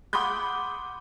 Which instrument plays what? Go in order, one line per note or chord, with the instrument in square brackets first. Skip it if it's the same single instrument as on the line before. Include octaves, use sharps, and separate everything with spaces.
[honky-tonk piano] F#5 B5 C6 D6 D#6 G6